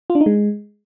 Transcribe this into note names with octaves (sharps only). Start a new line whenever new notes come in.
F4
D4
D#4
G#3